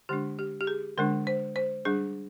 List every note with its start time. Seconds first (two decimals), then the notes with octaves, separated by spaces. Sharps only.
0.09 D3 G#3 D4 G4
0.39 G4
0.61 G4
0.67 G#4
0.98 D3 G#3 D4 A#4
1.27 C5
1.56 C5
1.85 G3 D4 G#4